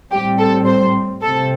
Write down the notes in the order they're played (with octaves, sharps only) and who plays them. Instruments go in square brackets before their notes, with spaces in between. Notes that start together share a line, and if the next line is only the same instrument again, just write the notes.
[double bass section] A2 G3 C4 [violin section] G4
[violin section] A4
C5
[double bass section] C3 A3 C4 [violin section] A4